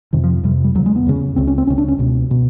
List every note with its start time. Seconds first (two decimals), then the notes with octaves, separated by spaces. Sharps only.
0.13 F2 C3 D#3
0.24 F3
0.44 F2 C3 G3
0.64 G3
0.75 E2 F#3
0.79 C#3
0.86 G#3
0.96 B3
1.06 E2 C#3
1.36 C#2 C#3 C4
1.47 C#4
1.58 C4
1.67 C#2 C#3 C#4
1.78 D4
1.88 C#4
1.98 C#2 B2
2.31 B2